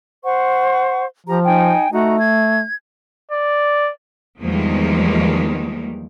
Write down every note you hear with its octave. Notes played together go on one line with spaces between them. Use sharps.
C5 F#5 C#6
F3 G4 A#5
D#4 G5 G#5
A3 D#4 F#4 A#5
G#6
D5
E2 D#3 F3 G3 G#3 A#3